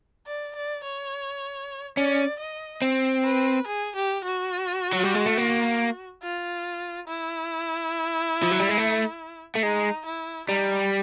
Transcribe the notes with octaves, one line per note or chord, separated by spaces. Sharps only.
D5
D5
C#5
C#4 D5
D#5
C4
B4
G#4
G4
F#4
F#3
G3
G#3
A3
A#3
F4
E4
F3
F#3
G3
G#3
A3
A3
G#3 D#4
E4
G3 D#4